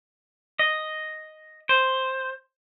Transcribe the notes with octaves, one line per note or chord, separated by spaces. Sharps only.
D#5
C5